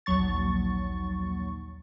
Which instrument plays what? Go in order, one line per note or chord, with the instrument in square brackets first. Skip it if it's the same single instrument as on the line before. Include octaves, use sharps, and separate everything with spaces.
[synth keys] A#1 D#2 F#3 C#6 A6